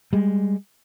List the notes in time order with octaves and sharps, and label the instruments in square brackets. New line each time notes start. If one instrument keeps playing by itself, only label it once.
[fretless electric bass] G3 G#3